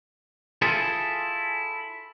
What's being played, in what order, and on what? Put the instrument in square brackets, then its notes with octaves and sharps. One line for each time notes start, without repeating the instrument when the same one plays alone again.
[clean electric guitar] E4 F4 G#4 A4